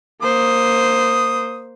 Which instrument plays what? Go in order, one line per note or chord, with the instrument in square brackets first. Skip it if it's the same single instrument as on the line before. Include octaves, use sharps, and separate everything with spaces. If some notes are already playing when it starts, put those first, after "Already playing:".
[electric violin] A#3 C5 [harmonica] D#6